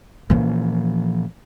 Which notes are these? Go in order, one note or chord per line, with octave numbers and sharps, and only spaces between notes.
A#2 E3 F3 A#3 C#4